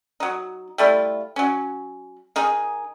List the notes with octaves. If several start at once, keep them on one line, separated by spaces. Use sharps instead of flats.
F#3 D#4
G3 A3 E4 F4
F#3 C#4
D#3 D#4 G#4